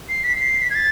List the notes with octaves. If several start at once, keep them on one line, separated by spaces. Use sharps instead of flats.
C7
B6
C7
B6
G#6
A6